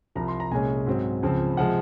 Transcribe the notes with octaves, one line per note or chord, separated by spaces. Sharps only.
C2 C3 F3 A#5
C6
A#5
C2 A#2 G#3 C#4 G#5
G#2 F#3 C4
C#2 C#3 F3 C4
C3 F3 G#3 F#5